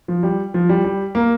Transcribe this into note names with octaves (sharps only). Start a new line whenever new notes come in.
F3
G3
F3
G3
G3
A#3